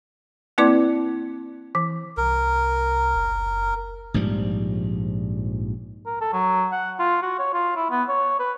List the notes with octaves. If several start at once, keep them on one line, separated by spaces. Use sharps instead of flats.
A#3 C4 E4 B4 D5 D6
E3
C2 A#4
F#1
A#1 G#2 F3 G3
A#4
A4
F#3
F#5
F4
F#4
C#5
F4
E4
B3
C#5
B4